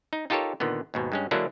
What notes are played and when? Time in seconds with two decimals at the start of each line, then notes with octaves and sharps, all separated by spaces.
0.13 D#4
0.30 D#4 F4 G4 A4 A#4 C#5
0.60 A#2 D3 D#3 B3
0.94 D#2 G#2 B2
1.12 G2 G#3 C#4
1.31 D3 F#3 G#3 A#3 D4 E4